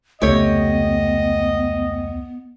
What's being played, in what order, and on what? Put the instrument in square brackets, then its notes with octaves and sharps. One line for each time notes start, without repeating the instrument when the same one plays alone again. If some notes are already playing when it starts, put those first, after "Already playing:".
[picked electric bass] F1 C#2 A3 [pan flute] B3 [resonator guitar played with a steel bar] G4 C#5 [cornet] D#5